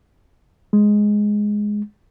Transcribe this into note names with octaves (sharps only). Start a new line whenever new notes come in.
G#3